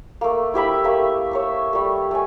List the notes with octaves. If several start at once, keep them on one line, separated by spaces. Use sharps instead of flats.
A3 A#3
E4 G4 E5 B5
A3 A#3 E5
C#5 C#6 E6
G3 A3
A3 G#5